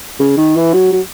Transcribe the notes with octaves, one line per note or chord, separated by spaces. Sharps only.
C#3
D#3
E3
F#3
F#3